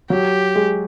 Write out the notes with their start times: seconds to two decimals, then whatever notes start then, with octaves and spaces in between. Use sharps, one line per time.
0.10 F#3 G4
0.55 G#3